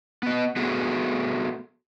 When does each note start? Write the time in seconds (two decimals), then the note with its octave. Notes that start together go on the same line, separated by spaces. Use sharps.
0.23 B3 D#5
0.56 A3 B3 F#4 G#4